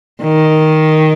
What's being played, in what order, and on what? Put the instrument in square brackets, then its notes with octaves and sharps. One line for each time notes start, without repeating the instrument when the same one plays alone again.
[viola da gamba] D#3